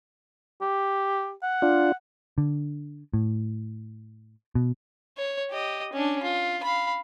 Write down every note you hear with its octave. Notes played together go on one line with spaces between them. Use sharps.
G4
F#5
D4 F4
D3
A2
B2
C#5
G4 D#5
C#4 D4
F4
F5 B5